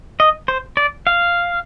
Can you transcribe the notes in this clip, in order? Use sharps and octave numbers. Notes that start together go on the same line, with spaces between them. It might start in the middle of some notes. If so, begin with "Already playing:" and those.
D#5
C5
D5
F5